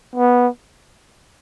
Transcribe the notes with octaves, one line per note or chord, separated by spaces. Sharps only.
B3